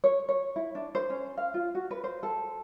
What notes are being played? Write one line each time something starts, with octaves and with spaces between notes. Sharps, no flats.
C#5
C#5
E4
D4
C5
C#4
F5
F4
F#4
B4
C5
A4